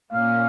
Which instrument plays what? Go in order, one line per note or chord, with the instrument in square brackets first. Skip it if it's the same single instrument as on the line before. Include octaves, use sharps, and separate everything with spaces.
[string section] A#2 A#3 C#4 [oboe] F5